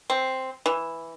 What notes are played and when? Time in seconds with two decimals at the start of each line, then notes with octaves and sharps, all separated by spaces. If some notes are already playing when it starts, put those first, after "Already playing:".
0.10 C4
0.66 E3